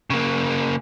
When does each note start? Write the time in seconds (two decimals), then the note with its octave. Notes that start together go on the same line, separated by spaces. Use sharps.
0.10 C#3 A#3